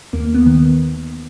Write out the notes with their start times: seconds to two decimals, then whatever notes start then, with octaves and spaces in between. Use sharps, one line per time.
0.13 D#2 A#3
0.34 B3
0.46 D#3